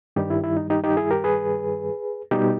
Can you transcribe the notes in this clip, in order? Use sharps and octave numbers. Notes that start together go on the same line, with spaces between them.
G2 D#3 G3 D#4 G4
E4
E4
D#4
D#4 G4
D#4 G4
E4 G#4
G4 A#4
G#4 B4
B2 G3 D#4 G4